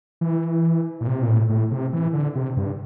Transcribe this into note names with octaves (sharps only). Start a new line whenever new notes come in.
E3
A#2
C3
A#2
A2
A2
C3
E3
D3
C3
G2